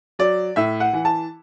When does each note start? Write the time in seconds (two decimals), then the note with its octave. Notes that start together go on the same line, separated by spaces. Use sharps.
0.19 F#3 D5
0.56 A2 E5
0.80 F#5
0.93 E3
1.05 A5